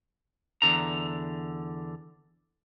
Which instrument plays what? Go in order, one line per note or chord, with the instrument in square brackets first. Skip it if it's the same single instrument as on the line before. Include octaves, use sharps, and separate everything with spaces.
[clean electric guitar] E2 D3 A#5